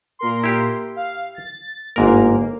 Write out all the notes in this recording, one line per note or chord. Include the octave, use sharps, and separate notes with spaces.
A#2 A#4 C6
E4 G4
F5
A6
G1 G#2 A#3 A#4